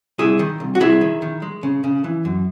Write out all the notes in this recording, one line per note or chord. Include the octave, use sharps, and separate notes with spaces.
C2 E4 G#4
D#3
C2
F#4
C2 E4 G#4
D#3
D#3
G#3
C#3
C#3
E3
F#2